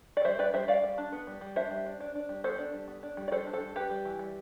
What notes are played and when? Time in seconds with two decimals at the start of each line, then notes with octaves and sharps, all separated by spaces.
0.17 D5
0.25 G3 C5 E5
0.38 G3 B4 D5
0.54 G3 C5 E5
0.68 G3 D5 F5
0.84 G3
0.98 D4
1.12 B3
1.27 G3
1.41 G3
1.56 D4 C5 E5
1.71 G3
1.86 D4
2.00 D4
2.15 D4
2.29 G3
2.44 B3 A4 C5
2.58 D4
2.74 G3
2.88 B3
3.03 D4
3.17 G3
3.28 D5
3.31 G3 A4 C5
3.47 D4
3.53 A4 C5
3.61 G3
3.76 G3 G4 B4
3.90 G3
4.05 E3
4.19 G3